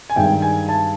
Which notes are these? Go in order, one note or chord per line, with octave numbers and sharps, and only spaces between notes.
G#5
G2 D#3 G#3 G5
G#5
A5